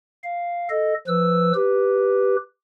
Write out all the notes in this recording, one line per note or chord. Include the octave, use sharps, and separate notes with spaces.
F5
A4 D#5
F3 B4 E6
G4 B4